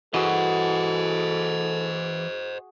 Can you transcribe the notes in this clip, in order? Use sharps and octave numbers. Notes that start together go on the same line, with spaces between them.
E3 F#4 G#4 A4 C5 D#5